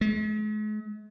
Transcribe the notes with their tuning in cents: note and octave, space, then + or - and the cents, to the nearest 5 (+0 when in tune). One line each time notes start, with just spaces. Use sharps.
G#3 +45